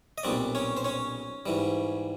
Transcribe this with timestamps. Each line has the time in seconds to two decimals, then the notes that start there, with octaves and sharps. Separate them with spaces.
0.18 D#5
0.23 B1 A#2 G3 C4 D4 D5
0.55 C#4 C#5
0.77 C5
0.84 C#4 C#5
1.46 G#2 E3 G3